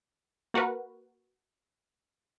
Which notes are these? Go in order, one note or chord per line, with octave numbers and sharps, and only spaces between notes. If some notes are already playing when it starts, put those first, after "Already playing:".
A#3 F#4 A#4 B4